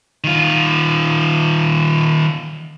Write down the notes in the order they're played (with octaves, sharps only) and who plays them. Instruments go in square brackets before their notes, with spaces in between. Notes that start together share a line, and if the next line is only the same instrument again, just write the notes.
[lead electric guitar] D#3 F4